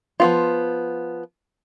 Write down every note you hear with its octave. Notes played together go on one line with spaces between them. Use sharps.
F3 B3 F4